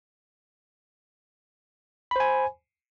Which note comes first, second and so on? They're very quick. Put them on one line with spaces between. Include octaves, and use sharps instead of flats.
B5 C5 G#5